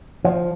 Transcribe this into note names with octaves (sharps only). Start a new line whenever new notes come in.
F3